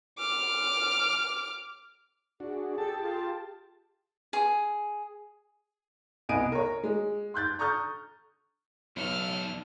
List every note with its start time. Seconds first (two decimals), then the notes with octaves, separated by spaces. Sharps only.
0.18 D6 F6
2.40 D4 F#4 G#4
2.78 G4 A4 A5
3.01 F4
4.33 G#4
6.29 C2 B3 D#5 G#5 D7 D#7
6.52 A#4 C#5
6.84 G#3
7.34 C6 F#6 G6 A6
7.59 A#5 C#6 D#6 F6 G6 A6
8.97 B1 E2 A4 F6